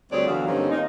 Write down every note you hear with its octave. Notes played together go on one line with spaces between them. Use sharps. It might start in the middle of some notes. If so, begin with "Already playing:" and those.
D2 G3 C4 G#4 C#5 D5
D3 E3 F#3 B3 F#4 F5
G2 D3 A#3 C4 C#4 D#4
D#2 A#3 C4 D#4